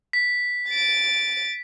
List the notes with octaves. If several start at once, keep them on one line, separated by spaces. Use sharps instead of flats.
B6
A6 D7